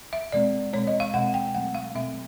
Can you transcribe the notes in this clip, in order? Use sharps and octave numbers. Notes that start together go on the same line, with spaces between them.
E5
B2 G#3 C4 D5
B2 G#3 C4 C#5
D#5
F5
B2 G#3 C4 F#5
G5
B2 F#3 A3 C4 F#5
F5
B2 F#3 A3 C4 E5